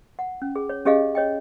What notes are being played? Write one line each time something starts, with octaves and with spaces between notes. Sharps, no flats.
F#5
C#4
G#4
C#5
C#4 G4 G#4 D#5 F5
C#5 D#5 G5